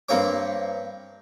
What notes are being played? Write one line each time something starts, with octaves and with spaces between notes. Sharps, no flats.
G2 A#3 C4 C#5 D6